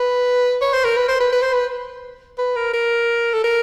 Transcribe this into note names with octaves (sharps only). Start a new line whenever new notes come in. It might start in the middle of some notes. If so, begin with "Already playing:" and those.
Already playing: B4
C#5
C5
A#4
B4
C5
B4
B4
C5
B4
B4
A#4
A#4
A4
A#4